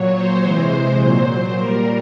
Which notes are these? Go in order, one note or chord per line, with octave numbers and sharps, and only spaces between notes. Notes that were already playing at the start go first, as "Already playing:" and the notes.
Already playing: A#2 F#3 C#5
C5
C3 E3 G#3
A#2 F#3
C5
A#2 G3 A#4